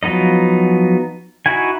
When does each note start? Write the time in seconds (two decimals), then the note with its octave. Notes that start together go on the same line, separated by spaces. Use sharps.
0.03 F3 F#3 B3 D#4 D#5
1.46 D#4 E4 F#4 G#5